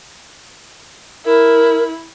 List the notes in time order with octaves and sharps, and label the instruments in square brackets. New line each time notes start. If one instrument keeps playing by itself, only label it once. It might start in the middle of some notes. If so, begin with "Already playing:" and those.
[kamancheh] E4 [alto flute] A#4